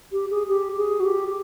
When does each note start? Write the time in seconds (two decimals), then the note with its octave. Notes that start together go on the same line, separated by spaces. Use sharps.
0.12 G4
0.30 G#4
0.48 G4
0.77 G#4
1.00 F#4
1.04 G4